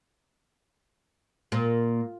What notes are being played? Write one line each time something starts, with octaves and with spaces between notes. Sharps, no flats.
A#2